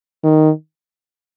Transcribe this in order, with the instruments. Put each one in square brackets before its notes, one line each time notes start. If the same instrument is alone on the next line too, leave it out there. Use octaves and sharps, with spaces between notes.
[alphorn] D#3